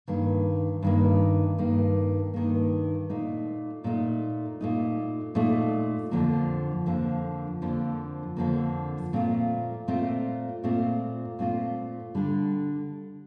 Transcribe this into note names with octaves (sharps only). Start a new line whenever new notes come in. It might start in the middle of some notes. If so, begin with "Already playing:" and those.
G2 D#3 A#3
G2 D#3 A#3
G2 D#3 A#3
G2 D#3 A#3
A#2 A3 D#4
A#2 A3 D#4
A#2 A3 D#4
A#2 A3 D#4
F2 D3 F3 A#3
F2 D3 F3 A#3
F2 D3 F3 A#3
F2 D3 F3 A#3
A#2 A3 C4 F4
A#2 A3 C4 F4
A#2 A3 C4 F4
A#2 A3 C4 F4
D3 G3 D4 G4